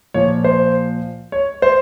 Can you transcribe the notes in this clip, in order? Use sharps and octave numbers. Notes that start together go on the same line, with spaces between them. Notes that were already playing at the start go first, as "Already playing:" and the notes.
A#2 F3 C#5
C5
C#5
C5